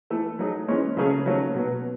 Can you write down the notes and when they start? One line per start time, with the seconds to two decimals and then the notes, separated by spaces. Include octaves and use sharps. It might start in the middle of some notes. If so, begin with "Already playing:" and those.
0.10 E3 A3 E4 A4
0.39 F#3 A3 D#4 G#4
0.68 E3 G#3 C#4
0.97 C#3 F#3 A3 C#4 G#4
1.26 D#3 F#3 A3 C#4
1.55 B2 F#3 B3